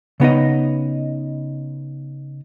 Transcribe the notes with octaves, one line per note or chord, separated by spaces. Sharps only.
C#3 B3 D#4 D#5